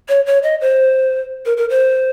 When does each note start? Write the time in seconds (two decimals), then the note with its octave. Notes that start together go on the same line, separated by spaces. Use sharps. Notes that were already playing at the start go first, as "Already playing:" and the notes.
0.09 C#5
0.26 C#5
0.43 D#5
0.61 C5
1.46 A#4
1.57 A#4
1.70 C5